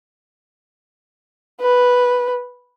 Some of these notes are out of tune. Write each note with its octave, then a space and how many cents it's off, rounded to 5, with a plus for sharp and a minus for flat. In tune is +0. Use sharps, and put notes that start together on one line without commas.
B4 -5